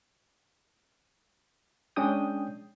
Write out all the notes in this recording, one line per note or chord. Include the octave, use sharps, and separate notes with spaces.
G#3 C#4 D4 G5 D#6 G6